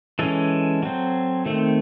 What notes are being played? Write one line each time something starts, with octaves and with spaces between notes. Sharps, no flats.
E3 G#3 C#4 A4
F#3 C4
D#3 A3 C4